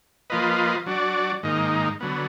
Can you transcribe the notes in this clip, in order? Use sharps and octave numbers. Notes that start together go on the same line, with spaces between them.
F3 A#3 F4 B4 D#5
F#3 D4 F#4 D5
G#2 D#3 A#3 D#4
D3 F#3 B3